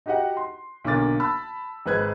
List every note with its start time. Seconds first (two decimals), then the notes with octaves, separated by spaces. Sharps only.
0.06 D#4 F#4 G4 D#5 F#5
0.37 C6
0.84 B1 D3 A#3 D6 A6
1.20 A5 B5 E6
1.86 G#1 G#3 B4 F#6 G#6